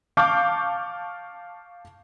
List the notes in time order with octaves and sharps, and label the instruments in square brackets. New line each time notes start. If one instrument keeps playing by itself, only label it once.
[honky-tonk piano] F5 A5 C#6 D6 F6 G6